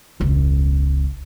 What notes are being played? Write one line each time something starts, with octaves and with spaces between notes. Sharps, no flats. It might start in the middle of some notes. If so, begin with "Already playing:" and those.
E1 C#2